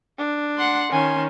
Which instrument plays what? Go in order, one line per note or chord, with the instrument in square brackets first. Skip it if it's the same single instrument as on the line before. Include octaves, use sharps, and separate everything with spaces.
[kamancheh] D4
[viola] F#5 C6
[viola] D#3 C#4 [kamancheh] G#5 C6